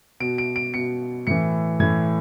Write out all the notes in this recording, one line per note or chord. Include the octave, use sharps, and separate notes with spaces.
B2 D7
D7
D7
B2 C#7
A2 E3 C#7
A2 E3 G#6